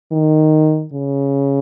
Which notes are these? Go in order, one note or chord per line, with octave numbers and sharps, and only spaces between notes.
D#3
C#3